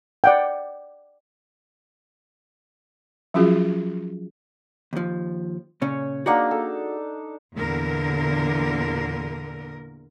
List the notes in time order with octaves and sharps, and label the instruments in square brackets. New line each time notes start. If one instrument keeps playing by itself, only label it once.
[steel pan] D5 F#5 G5
[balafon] F3 F#3 C#4 F4 F#4 G#4
[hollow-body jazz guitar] D#2 F3
[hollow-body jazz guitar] A#2 C#3 C#4 [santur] C#5
[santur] A#3 D4 D#4 [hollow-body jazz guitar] F#4 G#4 F#5
[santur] A4
[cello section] E2 A#2 D3 A#4